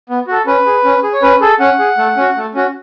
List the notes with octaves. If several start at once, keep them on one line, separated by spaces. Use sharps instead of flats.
B3
F#4 A4
C#4 B4
G#4
C#4
G#4
C#5
C#4 B4
G#4 A4
C#4 F#5
G#4
A3
C#4 F#4
A3
C#4 F#4